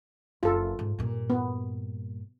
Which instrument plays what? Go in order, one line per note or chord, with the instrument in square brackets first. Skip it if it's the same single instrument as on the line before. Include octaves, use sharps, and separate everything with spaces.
[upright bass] F#1 [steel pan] F4 A4
[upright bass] G#2
G2 A#2
[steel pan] B3